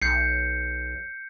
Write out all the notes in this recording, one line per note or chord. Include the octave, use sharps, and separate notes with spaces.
B1 G6 C7 C#7